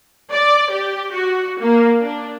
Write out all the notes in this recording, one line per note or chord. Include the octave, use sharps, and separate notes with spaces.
D5
G4
F#4
A#3
D4